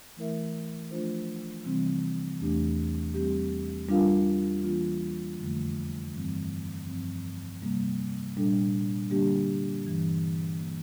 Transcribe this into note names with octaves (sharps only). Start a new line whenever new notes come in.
E3 A3 E4 A#4 E5
F3 A3 D4 F4 C5
C3 E3 G3 C4
E2 E3 A3 D4 G4
G3 C4 G4
G3 D4 F4 A#4 F5
E3 A#3 D4 F4
F2 D3 F3 A3
G2 E3 G3 C4
G2 F3 C4
C3 G3 A#3
A#2 G3 D4 A4
D3 G3 A#3 D4 G4
G2 E3 G3
E3 A#3